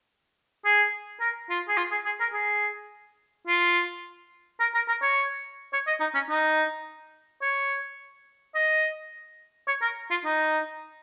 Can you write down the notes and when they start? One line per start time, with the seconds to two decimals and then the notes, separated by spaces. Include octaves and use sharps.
0.65 G#4
1.20 A#4
1.50 F4
1.68 G#4
1.77 F4
1.92 G#4
2.05 G#4
2.20 A#4
2.33 G#4
3.47 F4
4.60 A#4
4.74 A#4
4.88 A#4
5.02 C#5
5.73 C#5
5.87 D#5
6.00 D#4
6.14 C#4
6.29 D#4
7.42 C#5
8.55 D#5
9.67 C#5
9.82 A#4
10.11 F4
10.25 D#4